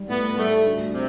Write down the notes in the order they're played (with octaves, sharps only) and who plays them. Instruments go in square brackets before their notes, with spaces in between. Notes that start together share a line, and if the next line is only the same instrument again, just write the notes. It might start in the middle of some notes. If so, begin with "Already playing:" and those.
Already playing: [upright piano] G3
[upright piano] A2 [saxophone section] B3
[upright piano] G3 [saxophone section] A3
[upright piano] D2
[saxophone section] C3